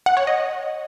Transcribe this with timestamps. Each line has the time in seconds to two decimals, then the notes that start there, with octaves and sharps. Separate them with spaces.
0.06 F#5
0.17 C#5
0.27 D#5